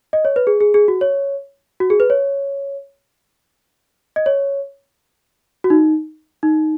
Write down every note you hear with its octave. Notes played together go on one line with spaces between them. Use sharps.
D#5
C#5
B4
G#4
G#4
G#4
F#4
C#5
F#4
G#4
B4
C#5
D#5
C#5
F#4
D#4
D#4